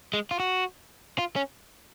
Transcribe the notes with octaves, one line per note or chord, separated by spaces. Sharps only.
G#3
F4
F#4
F4
C#4